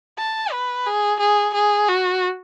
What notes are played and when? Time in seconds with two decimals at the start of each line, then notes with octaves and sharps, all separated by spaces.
0.18 A5
0.52 B4
0.87 G#4
1.20 G#4
1.54 G#4
1.88 F#4